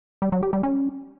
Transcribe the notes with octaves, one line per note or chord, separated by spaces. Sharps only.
G3
F#3
G4
G3
C#4